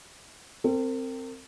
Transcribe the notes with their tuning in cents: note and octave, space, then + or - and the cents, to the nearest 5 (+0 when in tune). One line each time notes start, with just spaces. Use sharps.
C4 +0 A#4 -40